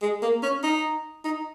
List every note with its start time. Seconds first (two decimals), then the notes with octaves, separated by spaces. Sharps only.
0.02 G#3
0.22 A#3
0.43 C#4
0.63 D#4
1.25 D#4